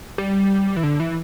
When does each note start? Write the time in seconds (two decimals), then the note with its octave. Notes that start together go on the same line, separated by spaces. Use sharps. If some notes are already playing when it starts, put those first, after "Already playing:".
0.18 G3
0.76 E3
0.83 D3
1.00 E3